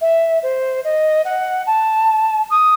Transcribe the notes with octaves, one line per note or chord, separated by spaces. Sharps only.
E5
C5
D#5
F#5
A5
D#6